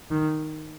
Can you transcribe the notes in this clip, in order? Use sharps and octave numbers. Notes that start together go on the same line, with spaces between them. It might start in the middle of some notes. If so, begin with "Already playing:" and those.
D#3